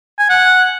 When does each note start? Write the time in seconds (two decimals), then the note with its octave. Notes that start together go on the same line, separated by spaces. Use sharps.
0.19 G#5
0.30 F#5